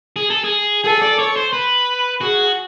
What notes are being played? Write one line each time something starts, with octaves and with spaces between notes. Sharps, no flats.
G#4
A4
G#4
G#4 A4
D5
C#5
C5
B4
F#4 G#4